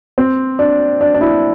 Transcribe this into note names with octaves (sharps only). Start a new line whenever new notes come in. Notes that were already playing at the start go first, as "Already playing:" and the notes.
C4
D4
D4
D4
E4